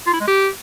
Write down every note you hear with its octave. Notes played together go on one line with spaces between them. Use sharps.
F4
E4
G#3
G4